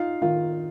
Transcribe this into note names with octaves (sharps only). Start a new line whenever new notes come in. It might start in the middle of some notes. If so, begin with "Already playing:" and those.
Already playing: D#4 F4 F5
D#3 F4 F5